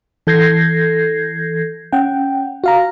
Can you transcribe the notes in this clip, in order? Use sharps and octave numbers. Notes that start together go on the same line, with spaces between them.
E3 A4 G6 G#6 A#6 C7
C#4 F#5 G5
F#4 F5 A#5